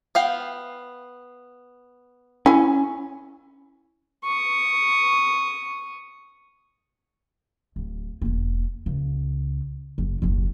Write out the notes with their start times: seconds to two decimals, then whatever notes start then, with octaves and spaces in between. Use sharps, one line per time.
0.15 B3 F5 G5
2.46 C#4 E4 G#5
4.24 C#6 D#6
7.76 D1
8.22 E1 A#3
8.86 C#2
9.98 F#1
10.22 F#1 D#2